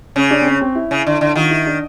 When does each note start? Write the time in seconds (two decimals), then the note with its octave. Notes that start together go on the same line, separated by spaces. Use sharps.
0.16 C#3 C#4
0.31 D4
0.41 C4
0.46 C#4
0.61 C4
0.75 E4
0.91 C#3
1.07 D3
1.21 D3
1.35 D#3 F4
1.51 E4
1.66 D4